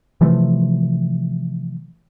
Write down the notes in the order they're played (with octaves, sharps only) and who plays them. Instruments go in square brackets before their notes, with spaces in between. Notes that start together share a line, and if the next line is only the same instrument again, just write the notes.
[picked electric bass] C3 E3 F3 A3